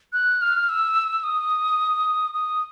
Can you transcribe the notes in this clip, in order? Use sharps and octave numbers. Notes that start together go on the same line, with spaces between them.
F#6
F6
E6
D#6
D#6